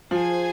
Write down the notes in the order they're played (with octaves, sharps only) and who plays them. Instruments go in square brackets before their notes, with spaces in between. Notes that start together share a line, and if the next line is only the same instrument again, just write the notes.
[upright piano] F3 [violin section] G#4 C5 G#5